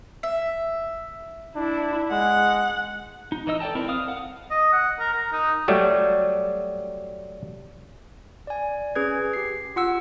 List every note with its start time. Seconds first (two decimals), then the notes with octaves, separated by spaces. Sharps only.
0.23 E5
1.56 D4 E4
2.11 G#3 F#5
3.32 D#4
3.47 E3 D#4 D#5 E6
3.60 A4 D5 G5 A5
3.75 C4 E4 A#4
3.88 F5 D#6 F6
4.08 F5 F#5
4.51 D#5
4.73 F#5
5.00 A#4
5.13 A#4
5.32 D#4
5.68 F#3 G3 A3
8.47 D5 G#5
8.95 C#4 G#4 B4 G#6
9.33 G4 C7
9.76 F4 F#5 E6